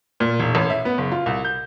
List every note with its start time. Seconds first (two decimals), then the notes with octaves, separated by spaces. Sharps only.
0.20 A#2
0.40 E1
0.55 A1
0.70 E5
0.85 B3
0.98 F#1
1.12 F4
1.26 C2
1.45 G6